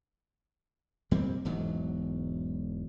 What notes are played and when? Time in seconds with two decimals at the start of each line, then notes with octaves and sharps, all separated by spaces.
1.11 F2 G3 A#3 C4
1.45 E1 E2 G#2 F#3